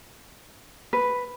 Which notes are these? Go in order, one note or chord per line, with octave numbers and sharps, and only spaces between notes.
B4